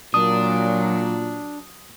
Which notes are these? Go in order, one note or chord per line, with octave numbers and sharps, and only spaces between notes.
A#2 F#3 D4 D#6